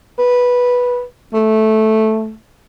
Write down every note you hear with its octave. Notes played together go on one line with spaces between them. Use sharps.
B4
A3